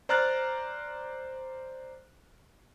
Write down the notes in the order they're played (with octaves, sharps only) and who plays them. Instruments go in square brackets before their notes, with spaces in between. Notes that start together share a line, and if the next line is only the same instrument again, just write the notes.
[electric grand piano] C5 D5 A#5 F6 F#6 A6